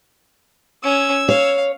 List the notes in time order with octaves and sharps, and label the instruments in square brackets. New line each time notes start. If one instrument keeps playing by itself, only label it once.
[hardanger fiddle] C#4 [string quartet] E6 G#6
[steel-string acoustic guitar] C#5 [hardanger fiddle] F5